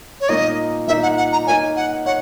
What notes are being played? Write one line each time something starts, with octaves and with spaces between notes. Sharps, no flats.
C#5
A#2 A#3 D#4 D#5
A#2 A#3 D#4 E5
F#5
F#5
A#5
A#3 D#4 A#4 C#5 G#5
F#5
C#5 F#5